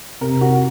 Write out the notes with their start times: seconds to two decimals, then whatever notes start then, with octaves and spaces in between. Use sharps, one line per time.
0.21 C3 A#4
0.41 F#4